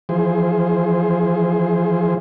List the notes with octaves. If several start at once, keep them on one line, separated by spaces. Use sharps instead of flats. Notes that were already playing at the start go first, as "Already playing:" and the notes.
E3 F3 G#4 C5